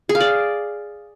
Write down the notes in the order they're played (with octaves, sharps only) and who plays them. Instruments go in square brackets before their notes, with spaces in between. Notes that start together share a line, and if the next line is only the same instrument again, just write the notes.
[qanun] G#4
F5
D5